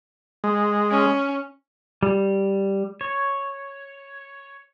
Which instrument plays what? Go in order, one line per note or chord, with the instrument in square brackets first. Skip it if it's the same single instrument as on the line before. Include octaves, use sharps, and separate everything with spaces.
[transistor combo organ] G#3
[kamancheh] C#4
[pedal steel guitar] G3
C#5